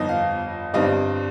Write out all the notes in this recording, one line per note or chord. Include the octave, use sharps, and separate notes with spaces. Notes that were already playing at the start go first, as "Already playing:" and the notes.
Already playing: G1 F2 F3 D#4 D#5
F5
G1 G2 G3 C4 D#4 D#5